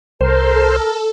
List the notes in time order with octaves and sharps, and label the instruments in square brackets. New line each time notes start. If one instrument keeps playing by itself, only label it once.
[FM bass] C2 [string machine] A4 [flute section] A#4 [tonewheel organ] C5